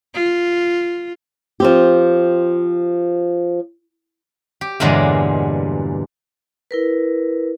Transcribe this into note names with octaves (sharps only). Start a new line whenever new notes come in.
F4
F3 C4 G4
G4
E2 G2 A#2 D3 F#3 G#3
E4 A#4 B4